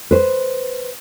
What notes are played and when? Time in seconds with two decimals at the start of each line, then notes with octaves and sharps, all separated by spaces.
0.11 B4 C5